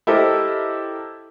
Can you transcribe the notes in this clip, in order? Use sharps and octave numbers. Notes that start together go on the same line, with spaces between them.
E4 G4 A4 A#4 C5 D#5